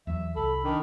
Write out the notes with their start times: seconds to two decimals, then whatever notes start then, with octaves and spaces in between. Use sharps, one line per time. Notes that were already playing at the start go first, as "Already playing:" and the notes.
0.07 E2 F#3 E5
0.36 C2 A4 B5
0.64 D#3 D4